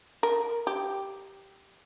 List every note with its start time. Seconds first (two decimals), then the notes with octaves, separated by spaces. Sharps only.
0.23 A#4
0.67 G4